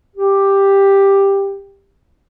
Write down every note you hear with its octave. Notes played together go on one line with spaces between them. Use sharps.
G4